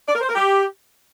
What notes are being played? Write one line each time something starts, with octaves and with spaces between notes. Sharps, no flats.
D5
A#4
C5
A#4
G4